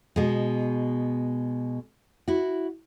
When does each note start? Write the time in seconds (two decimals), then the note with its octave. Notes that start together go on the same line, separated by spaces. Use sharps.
0.16 B2 G#3
2.28 E4 F#4